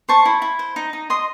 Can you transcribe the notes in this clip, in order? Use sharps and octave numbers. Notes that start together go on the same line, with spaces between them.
C5 A5 C#6
E4
E4
C5
D#4
D#4
D#5 C6 D#6